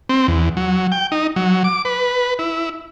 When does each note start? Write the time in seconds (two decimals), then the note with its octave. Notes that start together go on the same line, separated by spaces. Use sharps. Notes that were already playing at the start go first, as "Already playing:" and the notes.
0.09 C4
0.28 E2
0.57 F#3
0.92 G5
1.12 D#4
1.36 F#3
1.64 D6
1.85 B4
2.39 E4